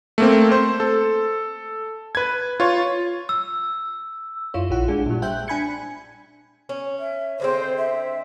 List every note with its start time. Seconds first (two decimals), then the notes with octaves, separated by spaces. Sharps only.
0.18 A3 A#3 C4
0.52 C5
0.80 A4
2.15 B4 G#6
2.60 F4 C#5
3.29 E6
4.54 F#2 E4 F4 C#5
4.70 A#1 E4 F4 F#5
4.88 G#3 D4 G#4
5.06 A#2 G3
5.22 C5 E5 G5 F#6 G6
5.48 D4 G#5 B5 G#6 C#7
6.69 C#4
6.99 E5
7.40 D3 G#3 C4 C5
7.77 E5